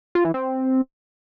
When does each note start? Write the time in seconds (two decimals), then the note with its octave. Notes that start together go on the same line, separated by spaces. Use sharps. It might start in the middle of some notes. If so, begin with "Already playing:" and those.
0.15 F4
0.25 E3
0.34 C4